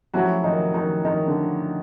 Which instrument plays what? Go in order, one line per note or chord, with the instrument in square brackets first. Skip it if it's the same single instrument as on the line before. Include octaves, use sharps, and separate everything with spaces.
[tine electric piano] F3 A3 C#4 E4 G4 [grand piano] F#3 F#4
[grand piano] D#3 D#4
D#3 D#4
D#3 D#4
D3 D4